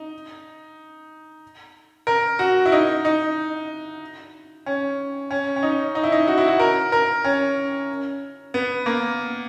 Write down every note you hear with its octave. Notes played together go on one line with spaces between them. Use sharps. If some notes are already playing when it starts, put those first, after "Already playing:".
Already playing: D#4
A#4
F#4
E4
D#4
D#4
C#4
C#4
C#4
D#4
D#4
E4
D#4
F#4
E4
F#4
A#4
A#4
C#4
B3
A#3